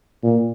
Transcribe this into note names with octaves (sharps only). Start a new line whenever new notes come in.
A#2